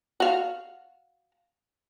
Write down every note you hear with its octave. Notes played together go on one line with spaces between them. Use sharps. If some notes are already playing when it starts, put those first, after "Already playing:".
F#4 F5